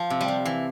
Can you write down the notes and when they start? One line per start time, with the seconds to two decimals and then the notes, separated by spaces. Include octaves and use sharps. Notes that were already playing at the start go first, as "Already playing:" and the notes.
Already playing: F3
0.10 C3
0.21 G3
0.28 F3
0.45 E3